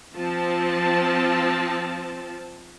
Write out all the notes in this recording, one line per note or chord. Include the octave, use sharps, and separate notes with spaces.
F3 C4 A5